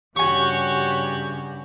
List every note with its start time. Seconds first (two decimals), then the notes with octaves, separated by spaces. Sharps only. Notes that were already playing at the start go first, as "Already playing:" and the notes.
0.16 G2 C#3 F#4 G4 C#5 G#5 C#6